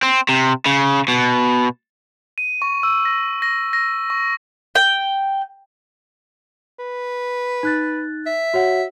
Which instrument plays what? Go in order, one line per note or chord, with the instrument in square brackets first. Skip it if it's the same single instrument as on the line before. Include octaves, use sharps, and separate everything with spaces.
[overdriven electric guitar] C4
C3
C#3
B2
[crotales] D#7
C#6
E6
A#6
A#6
A#6
C#6
[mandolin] G5
[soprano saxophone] B4
[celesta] D#4 F#6 A6
[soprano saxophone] E5
[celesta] F#4 C#5 F#5